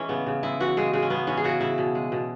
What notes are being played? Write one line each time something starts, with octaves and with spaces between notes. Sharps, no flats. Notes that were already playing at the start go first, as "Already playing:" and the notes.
Already playing: E3 G#3 C#4 E4
C#3 B3
C#3
G#3 E4
E3 F#4
C#3 G#3
C#3 G#3
C#4
G#3 B3
E3 C#4
G#4
C#3 F#4
C#3 E4
B2
G#3
B2